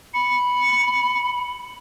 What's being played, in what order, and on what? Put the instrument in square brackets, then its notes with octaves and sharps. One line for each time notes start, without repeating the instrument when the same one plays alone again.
[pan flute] B5 [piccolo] C#7